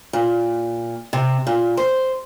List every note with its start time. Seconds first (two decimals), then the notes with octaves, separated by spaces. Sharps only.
0.13 A#2
1.13 C3
1.47 A#2
1.77 C5